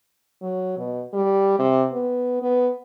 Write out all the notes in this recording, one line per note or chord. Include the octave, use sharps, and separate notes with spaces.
F#3
B2
G3
C3
B3
B3